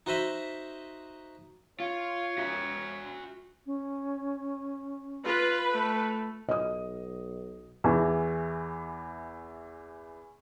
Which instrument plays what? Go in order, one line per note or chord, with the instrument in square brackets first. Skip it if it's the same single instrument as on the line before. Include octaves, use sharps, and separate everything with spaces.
[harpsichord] D#4 F#4 C5 D#5 E5 B5
[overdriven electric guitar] F4 [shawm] C#5
[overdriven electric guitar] F#4 E5
[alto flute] C#4
[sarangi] F4 [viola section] B4
[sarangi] A3
[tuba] B1 [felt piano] D#5 D#6
[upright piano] E2 E3